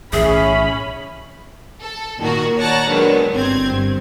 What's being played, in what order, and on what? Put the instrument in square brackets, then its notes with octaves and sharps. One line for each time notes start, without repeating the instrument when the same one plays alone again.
[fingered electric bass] B1 A2 E3 [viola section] C#4 B5 [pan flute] G#4 [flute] E5
[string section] A4
A#2 D#3 F#4 A#4
C#5 D5 F#5 A5 A#5
D3 D#3 F#3 G#3 B3
G1 C4 G#6
G2